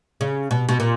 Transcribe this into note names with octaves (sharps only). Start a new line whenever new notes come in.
C#3
B2
B2
A#2